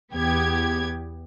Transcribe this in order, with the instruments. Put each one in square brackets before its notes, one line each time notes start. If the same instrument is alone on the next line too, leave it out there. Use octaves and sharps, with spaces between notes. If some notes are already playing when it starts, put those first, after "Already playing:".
[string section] E2 B3 G4 G#6